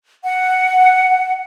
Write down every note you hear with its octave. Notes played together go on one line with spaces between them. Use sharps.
F#5